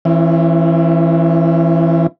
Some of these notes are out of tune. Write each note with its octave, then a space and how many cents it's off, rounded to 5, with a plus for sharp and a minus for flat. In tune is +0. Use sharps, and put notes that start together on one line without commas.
E3 +0 C#4 -45 E4 +45